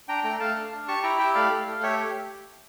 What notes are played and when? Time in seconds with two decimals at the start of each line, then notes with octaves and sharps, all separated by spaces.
0.08 D4 G5 A#5
0.24 A3 G5 A#5
0.40 A3 F5 A5
0.56 D4
0.72 D4
0.88 G4 A5 C#6
1.03 E4 G5 A#5
1.19 G4 E5 G5
1.35 A3 D5 F5
1.52 A3
1.67 A3
1.76 F5
1.83 G4 C#5 E5